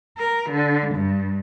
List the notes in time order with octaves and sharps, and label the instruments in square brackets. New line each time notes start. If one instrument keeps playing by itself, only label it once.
[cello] A#4
D3
G2